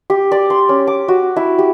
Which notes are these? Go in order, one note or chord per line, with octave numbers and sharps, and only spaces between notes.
G4
D5
C6
C#4
D6
F#4
E4
G4